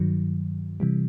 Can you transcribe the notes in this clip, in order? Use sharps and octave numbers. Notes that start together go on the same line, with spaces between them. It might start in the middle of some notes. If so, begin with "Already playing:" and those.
Already playing: G2 D#3 F#3
C3 E3 G3